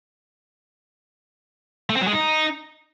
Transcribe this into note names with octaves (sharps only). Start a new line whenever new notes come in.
A3
C4
F#3
G#3
D#4